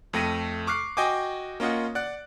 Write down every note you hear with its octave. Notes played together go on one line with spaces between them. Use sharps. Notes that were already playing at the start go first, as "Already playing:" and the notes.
F2 A3 G5 A#6 D#7
C#6 D6 F6 F#6 C7
F#4 D#5 G5 G#5 D6
A#3 C#4 F4 D#5 F#5
D5 F#5 F#6